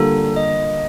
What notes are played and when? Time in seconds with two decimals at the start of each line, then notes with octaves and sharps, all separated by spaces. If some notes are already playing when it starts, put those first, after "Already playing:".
Already playing: D3 G3 A#3 F4 A4
0.36 D#5